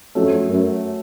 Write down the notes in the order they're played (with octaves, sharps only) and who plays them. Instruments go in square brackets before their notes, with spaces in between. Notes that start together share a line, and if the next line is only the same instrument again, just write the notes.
[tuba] F2 [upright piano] F#3 A3 C#4
[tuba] F#2